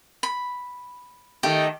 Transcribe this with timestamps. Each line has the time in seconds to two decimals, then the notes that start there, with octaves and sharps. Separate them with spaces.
0.23 B5
1.43 D#3 A3 G4